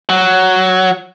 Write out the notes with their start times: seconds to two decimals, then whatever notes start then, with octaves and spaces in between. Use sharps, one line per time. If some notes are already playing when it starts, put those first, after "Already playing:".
0.09 F#3